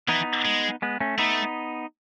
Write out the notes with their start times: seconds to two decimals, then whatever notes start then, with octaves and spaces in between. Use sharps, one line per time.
0.08 E3 B3 D#4
0.45 G#3
0.82 G#3 B3
1.00 A3 C#4
1.18 A3 B3 D#4